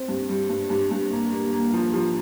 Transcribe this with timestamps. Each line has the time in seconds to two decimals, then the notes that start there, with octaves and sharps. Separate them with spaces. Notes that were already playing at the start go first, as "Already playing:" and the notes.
Already playing: C4
0.08 G2
0.29 G3
0.49 G2
0.70 G2
0.91 G2
1.11 A#3
1.32 A#3
1.53 A#3
1.73 F3
1.94 F3